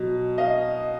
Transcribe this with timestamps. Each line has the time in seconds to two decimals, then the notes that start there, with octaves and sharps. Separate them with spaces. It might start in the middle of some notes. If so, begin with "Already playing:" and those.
Already playing: B2 F#3
0.38 D#5 F5